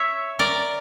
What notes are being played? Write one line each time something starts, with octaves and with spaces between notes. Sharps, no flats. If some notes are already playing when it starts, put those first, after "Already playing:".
Already playing: C#5 E5
A#4 D5